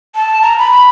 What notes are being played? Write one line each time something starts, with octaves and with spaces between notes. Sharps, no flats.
A5
A#5
B5